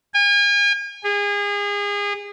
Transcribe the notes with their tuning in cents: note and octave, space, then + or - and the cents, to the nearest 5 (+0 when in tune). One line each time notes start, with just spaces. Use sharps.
G#5 -40
G#4 -30